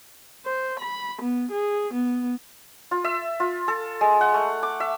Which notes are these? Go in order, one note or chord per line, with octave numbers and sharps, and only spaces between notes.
C5
B5
B3
G#4
B3
F4
E5
F4
A4
G#3
F#5
A3
D6
E5